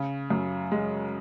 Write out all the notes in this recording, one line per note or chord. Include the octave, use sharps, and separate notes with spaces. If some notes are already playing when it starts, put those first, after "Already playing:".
Already playing: C#3
F#2
G#3